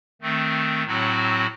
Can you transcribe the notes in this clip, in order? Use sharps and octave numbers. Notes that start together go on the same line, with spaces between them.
D#3 A3 C4
A2 F#3 C4 F#4